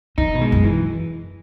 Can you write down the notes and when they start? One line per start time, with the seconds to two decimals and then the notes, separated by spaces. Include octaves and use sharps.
0.18 D#3 D#4
0.35 B2
0.41 G#3
0.52 F#2
0.64 E3